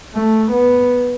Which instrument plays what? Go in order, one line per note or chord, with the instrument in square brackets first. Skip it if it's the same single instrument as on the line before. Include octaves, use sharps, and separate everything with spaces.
[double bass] A3
B3